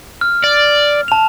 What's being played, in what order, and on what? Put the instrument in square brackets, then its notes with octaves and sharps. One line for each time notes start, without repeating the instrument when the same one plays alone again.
[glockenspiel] F6
[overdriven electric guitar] D5
[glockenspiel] A5 F7